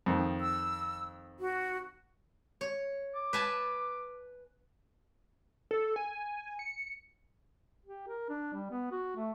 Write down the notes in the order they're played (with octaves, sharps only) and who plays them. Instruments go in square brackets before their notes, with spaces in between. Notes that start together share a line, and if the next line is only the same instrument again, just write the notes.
[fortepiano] F2 D#3
[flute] E6
F#4
[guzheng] C#5
[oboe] D6
[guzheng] B4 G#5 A5
[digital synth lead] A4
G#5
C#7
[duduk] G4
A#4
D4
G3
B3
F#4
A3